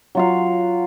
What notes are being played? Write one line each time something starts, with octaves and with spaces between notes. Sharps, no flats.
F#3 F4 F5